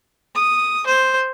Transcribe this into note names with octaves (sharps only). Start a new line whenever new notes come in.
D#6
C5